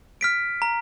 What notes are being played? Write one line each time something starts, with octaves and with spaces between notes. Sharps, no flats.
F6 B6 D7
A#5